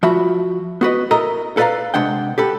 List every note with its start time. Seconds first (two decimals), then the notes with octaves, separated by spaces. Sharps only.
0.03 F3 F#4 E5 B5
0.81 B3 F#4 B4 D#5
1.11 E4 A4 A#4 D#5 A#5
1.57 A4 B4 D5 E5 F5 A#5
1.94 C3 G#3 D4 F#5 G5
2.38 G4 A4 B4